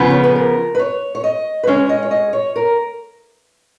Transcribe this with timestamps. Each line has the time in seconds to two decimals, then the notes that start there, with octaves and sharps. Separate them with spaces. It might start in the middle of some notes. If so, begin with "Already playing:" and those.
Already playing: C#3 F3 B3 G#4
0.11 C#5
0.24 B4
0.36 A#4
0.75 B4
0.79 C#5
1.15 C#5
1.24 D#5
1.63 B4
1.67 G#3 C#4 G#4 C#5
1.89 D#5
2.03 C#5
2.11 D#5
2.33 C#5
2.56 A#4